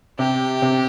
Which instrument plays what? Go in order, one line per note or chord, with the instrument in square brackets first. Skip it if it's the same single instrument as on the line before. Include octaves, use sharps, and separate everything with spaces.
[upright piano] C3 [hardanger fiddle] G4
[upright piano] C3